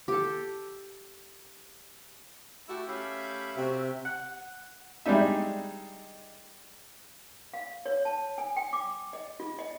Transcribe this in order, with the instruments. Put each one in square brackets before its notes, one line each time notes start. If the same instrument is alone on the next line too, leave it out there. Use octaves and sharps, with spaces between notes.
[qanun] G4 A4
[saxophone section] A3 E4 F#4 [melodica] G4
[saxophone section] A3 C#4 G4 [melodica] E5 F5 B5
[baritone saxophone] C3 [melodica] F#4 E5
[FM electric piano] F#5
[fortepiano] G3 G#3 D4 D#4 E5
[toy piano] F5
C#5
A5
G#5
G5
D6
D#5
F4
D#5